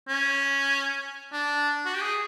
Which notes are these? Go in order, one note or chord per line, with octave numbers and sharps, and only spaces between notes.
C#4
D4
F#4
G4
G#4